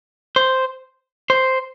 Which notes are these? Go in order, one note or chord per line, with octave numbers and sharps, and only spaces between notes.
C5
C5